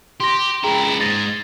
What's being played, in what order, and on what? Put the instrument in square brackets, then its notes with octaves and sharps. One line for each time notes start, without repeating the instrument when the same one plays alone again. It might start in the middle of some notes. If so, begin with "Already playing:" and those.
[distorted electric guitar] G4 [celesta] C6 A#6
[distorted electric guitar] C#2 E4 [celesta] G#4 G5 A#5
[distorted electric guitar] G#2 G#3 [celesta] A6 A#6